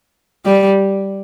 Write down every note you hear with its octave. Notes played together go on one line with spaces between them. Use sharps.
G3